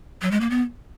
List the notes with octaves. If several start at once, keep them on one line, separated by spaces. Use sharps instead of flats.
F#3
G#3
A#3
B3